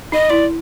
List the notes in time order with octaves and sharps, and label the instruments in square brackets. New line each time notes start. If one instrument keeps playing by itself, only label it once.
[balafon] D#4 [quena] D#5
[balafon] E4 [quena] D5